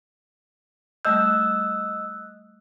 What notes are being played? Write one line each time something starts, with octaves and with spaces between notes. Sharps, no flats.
G3 A3 D#5 E6 F#6 G6